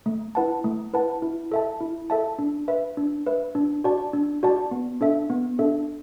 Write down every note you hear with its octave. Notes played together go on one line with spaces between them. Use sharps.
A3
E4 B4 F#5 A5
A3
E4 B4 F#5 A5
E4
A4 E5 A5
E4
A4 E5 A5
D4
B4 E5
D4
B4 E5
D4
F#4 D5 A5
D4
F#4 D5 A5
B3
D4 A4 E5
B3
D4 A4 E5